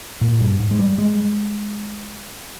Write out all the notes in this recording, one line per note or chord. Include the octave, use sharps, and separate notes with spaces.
A#2
G2
G#2
G#3
G3
G#3